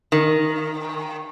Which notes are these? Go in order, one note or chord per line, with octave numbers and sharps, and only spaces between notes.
D#3